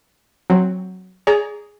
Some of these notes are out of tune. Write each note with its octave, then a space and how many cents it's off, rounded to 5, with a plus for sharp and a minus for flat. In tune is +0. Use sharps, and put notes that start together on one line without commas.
F#3 +5 C4 +15
G#4 +0 D5 -40 A#5 +0